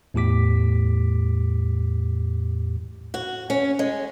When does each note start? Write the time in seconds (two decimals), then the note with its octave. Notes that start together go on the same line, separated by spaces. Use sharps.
0.14 E2 A2 G4 D6 B6
3.14 F#4
3.50 C#4
3.79 G#3